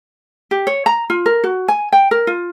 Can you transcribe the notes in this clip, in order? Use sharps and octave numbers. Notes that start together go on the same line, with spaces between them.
G4
C#5
A#5
F4
A#4
F#4
G#5
G5
A#4
F4